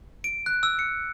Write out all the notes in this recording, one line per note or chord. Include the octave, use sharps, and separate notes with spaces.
D7
F#6
E6
C#7